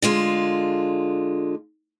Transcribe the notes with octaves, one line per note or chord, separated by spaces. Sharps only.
D3 G#3 F4